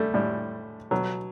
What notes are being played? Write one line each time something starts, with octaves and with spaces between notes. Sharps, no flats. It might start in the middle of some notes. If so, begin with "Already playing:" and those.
Already playing: G3 A3
A2 G3
B2 F#3